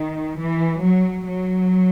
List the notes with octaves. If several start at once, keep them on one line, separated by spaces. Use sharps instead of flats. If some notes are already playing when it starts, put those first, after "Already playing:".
Already playing: D#3
E3
F#3
F#3